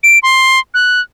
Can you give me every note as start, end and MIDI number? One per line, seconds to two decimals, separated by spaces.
0.04 0.19 98
0.23 0.59 84
0.74 1.01 90